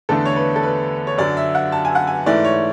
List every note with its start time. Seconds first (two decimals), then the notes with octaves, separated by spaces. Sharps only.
0.09 E2 D3 A3 D4 A4
0.25 C#5
0.36 B4
0.56 A4
0.63 B4
1.07 C#5
1.17 F#2 D3 F#3 D5
1.37 E5
1.55 F#5
1.72 A5
1.85 G#5
1.95 F#5
2.07 G#5
2.26 G#2 E3 A3 E4 D5
2.45 C#5